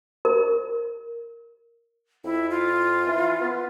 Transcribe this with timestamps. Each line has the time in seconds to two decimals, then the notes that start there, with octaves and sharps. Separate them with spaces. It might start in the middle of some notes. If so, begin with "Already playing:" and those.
0.25 A#4
2.24 F2 E4
2.50 F4
3.07 E3
3.41 B3